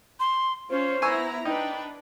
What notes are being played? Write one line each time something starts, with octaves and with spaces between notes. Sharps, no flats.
C6
C#4 F4 C5 C#5
B3 E4 G#5 A#5 C#6 E6
D4 D#4 B4 G5